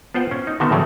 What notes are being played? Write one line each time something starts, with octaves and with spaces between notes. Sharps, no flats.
B3 F4 C5 F#5 G5
C#4
D#4
D3 D#3 A3 B3 F#4 E5
A2 C#3 E3 F#3 A3